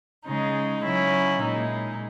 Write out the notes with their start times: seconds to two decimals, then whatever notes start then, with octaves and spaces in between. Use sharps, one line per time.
0.25 C#3 G#3 D#4
0.83 C#3 F#3 C#4 E4
1.40 A#2 G#3 D#4